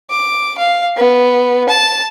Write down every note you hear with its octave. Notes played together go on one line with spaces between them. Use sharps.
D6
F5
B3
A5